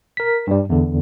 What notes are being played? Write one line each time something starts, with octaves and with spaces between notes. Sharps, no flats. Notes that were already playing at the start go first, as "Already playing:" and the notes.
A#4 B6
G2 G3
E2 D3